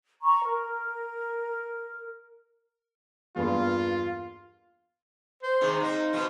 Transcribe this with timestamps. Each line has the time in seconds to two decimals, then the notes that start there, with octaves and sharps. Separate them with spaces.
0.23 A#5 C#6
0.44 A#4
3.36 E2 G2 A#3 F4
5.43 C5
5.61 C3 D#3 G#3
5.80 A#3 C4 D#4
6.13 B2 F3 C4